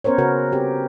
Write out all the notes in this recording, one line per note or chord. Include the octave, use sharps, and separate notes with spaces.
B3 C#4 A#4 C5 C#5
C#3 F#4 A#4 B4
C4 G4